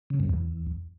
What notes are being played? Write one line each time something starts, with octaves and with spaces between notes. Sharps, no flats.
C#3
G2
E2